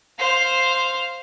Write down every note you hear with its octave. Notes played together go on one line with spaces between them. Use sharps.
C5 F5